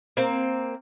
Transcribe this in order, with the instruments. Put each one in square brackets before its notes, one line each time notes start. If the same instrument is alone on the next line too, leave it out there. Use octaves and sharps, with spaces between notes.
[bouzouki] A#3 C4